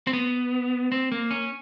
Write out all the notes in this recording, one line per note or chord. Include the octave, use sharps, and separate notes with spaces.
C4
B3
C4
A#3
C#4